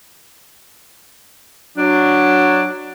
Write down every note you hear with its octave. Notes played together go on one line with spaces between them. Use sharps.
F#3 D4